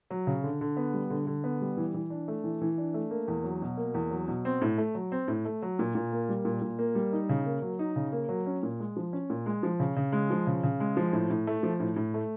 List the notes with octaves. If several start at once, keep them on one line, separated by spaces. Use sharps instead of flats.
F#3
C#3
D3
D3
B3
G3
D3
D3
B3
G3
E3
E3
D4
A3
E3
E3
D4
A3
A#3
E2
F#3
B2
A#3
E2
F#3
B2
C4
A2
A3
F#3
C4
A2
A3
F#3
A#2
A#2
A#3
G3
A#2
A#2
A#3
G3
D#4
C#3
A#3
F#3
D#4
C#3
A#3
F#3
C#4
A#2
G#3
F3
C#4
A#2
G#3
F3
C#3
C#3
G#3
F3
C#3
C#3
G#3
F3
A2
A2
A3
F3
A2
A2
A3